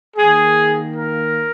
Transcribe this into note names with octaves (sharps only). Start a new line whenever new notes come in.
D#3 A#3 G#4
A#4